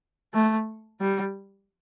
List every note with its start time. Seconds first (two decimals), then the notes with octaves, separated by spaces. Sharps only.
0.34 A3
1.00 G3